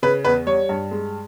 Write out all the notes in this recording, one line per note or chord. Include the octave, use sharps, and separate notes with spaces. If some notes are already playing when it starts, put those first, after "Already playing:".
C#3 B4
E2 B4
G3 C#5
G2
G#3